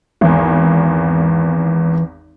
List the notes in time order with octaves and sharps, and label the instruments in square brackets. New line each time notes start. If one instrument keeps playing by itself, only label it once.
[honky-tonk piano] G#1 E2 [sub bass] E3